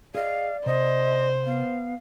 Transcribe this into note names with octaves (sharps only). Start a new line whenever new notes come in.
G#4 D5 D#5 F5
C3 C5 D#5
B3 F5